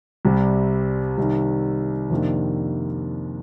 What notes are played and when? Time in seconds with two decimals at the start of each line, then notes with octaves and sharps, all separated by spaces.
0.25 C2 C3 G3
1.18 C2 C3 D#3
2.10 F2 C3 D#3 A#3 D4